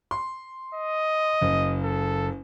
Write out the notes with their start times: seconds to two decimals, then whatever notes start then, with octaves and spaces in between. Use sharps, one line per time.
0.11 C6
0.75 D#5
1.41 F#1
1.83 A4